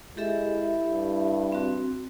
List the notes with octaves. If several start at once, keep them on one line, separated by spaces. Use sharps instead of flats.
G#3 E4 G4 A4 E5
G2
C4 F#4